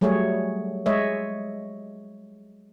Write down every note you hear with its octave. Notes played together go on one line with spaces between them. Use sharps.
F#3 G3 A3 G#4 C#5
G#3 C#5 D#5 E5